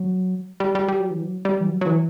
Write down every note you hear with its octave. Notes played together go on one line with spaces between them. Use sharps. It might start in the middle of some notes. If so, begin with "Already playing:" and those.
Already playing: F#3
G3
G3
G3
F#3
E3
F#3
G3
E3
F#3
F#3
E3